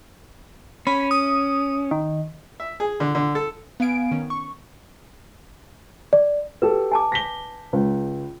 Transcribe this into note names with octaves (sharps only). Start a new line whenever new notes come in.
C#4 B5
D#6
D#3
E5
G#4
D3
D3
A4
B3 F5 G#5 D7
D#3 C#4
C#6
D5
F#4 G4 A4 B4
G#5 A5 D6
A#6 B6 G7
C#2